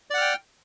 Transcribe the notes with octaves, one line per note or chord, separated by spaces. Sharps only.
D5 F#5 G5 F6